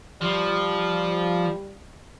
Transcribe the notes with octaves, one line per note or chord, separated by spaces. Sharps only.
F3 G3